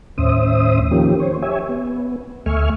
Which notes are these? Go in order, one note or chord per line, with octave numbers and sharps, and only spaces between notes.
D#2 A2 C#4 C5 E5 D#6
D#3 F3 A#3 C#4 G4
C5 C#5
G4 C#5 E5 G#5
B3
D2 A3 E5 G#5 C#6 F6